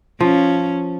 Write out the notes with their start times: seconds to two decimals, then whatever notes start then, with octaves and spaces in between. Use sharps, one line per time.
0.20 F3 C#4